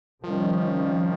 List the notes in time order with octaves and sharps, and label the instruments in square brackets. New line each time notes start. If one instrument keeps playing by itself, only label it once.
[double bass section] C3 D#3 G3 C#4 [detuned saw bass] F3